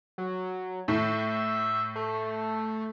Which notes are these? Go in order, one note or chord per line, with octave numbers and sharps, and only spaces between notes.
F#3
A2 E5
A3